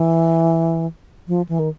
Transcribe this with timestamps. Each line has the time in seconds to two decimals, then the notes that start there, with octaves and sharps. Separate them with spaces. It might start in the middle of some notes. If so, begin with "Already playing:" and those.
Already playing: E3
1.28 F3
1.49 E3
1.59 D#3